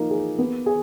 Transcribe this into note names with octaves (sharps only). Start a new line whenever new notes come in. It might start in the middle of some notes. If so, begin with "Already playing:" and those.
Already playing: F3 A#3 D#4
G#4
B3
G#4